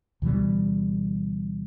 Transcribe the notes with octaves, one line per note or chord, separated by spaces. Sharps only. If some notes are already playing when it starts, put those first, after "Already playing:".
D2 B2 E3 G3